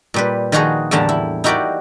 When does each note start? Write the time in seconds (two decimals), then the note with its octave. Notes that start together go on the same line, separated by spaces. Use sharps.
0.14 A#2 G3 B4
0.52 D#3 F3 D#4 F#4 G#4 D#5
0.91 E2 A2 D3 G3 A#3 A5
1.09 E4
1.44 D#4 E4 F#4 G4 A#4 D5